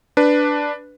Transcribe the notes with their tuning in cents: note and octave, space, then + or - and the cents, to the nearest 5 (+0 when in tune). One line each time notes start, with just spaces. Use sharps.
D4 +0 B4 +5